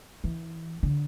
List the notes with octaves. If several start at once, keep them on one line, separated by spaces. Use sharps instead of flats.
E3
D3